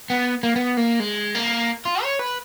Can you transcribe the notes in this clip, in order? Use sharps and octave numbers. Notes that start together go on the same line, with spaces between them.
B3
A#3
B3
A#3
G#3
A#3
F4
C#5
B4